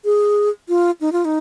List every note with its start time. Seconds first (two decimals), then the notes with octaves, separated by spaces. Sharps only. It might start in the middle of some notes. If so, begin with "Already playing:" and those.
0.05 G#4
0.69 F4
1.01 D#4
1.12 F4
1.25 D#4